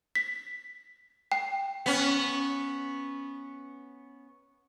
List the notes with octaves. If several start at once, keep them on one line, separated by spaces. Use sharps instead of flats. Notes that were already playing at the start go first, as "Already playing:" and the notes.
B6
G5
B3 C#4